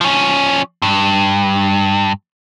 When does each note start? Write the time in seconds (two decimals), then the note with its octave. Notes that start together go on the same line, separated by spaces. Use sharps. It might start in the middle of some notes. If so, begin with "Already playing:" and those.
0.01 F3 C#4
0.82 G2